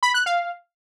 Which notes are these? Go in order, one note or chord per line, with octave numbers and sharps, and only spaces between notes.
B5
F#6
F5